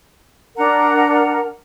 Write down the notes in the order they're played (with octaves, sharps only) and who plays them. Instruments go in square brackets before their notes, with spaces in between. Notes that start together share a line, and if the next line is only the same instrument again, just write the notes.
[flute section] D4 A#4 F#5 A#5